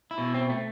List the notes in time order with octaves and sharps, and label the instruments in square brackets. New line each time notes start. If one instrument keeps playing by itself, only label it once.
[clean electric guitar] E4
B2
C4
A3